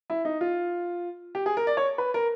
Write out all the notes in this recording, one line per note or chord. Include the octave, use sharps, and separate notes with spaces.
E4
D#4
F4
G4
G#4
A#4
D5
C#5
B4
A#4